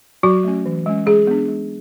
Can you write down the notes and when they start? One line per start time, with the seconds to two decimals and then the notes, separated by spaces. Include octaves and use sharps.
0.23 F#3 F#4
0.44 A3 C#4
0.66 E3
0.86 G#3 C#4
1.06 G#3 G#4
1.27 B3 D4
1.48 G#3